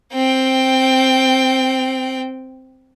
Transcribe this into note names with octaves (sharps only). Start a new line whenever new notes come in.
C4 G5